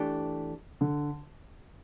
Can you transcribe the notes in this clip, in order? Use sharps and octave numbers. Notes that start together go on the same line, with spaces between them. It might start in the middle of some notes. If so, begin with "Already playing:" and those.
Already playing: E3 A3 D4 G4
D3